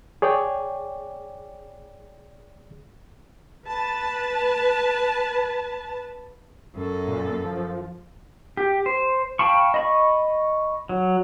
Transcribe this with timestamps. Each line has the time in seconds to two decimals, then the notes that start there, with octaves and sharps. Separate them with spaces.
0.22 G#4 C#5 D5 G5
3.66 B4 A5
6.75 F#2 A4
7.07 A#2
7.44 F3
8.57 G4
8.86 C5
9.39 F5 G5 A5 B5 C#6
9.74 D#5 B5 C#6
10.89 F#3